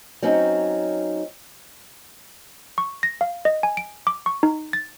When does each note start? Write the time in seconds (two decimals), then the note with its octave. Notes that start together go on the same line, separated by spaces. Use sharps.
0.23 F#3 C4 C#4 D#4
2.78 C#6
3.03 A#6
3.21 F5
3.45 D#5
3.63 G#5
3.77 D7
4.07 D6
4.26 C#6
4.43 D#4
4.73 A6